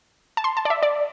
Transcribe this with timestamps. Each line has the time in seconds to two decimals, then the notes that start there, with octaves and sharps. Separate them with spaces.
0.37 A5
0.44 C6
0.57 A5
0.65 D5
0.70 E5
0.83 D5